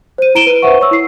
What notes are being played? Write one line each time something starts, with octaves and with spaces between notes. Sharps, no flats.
C5 D#7
E4 A#5 D7 E7 G7
B4 D#7
B4 C5 E5 F#5 C#6
C#5 C#6 E6
E4 C7